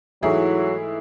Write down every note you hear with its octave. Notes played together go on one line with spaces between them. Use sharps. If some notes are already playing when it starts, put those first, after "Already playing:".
G#2 E3 F#3 A3 E4 G#4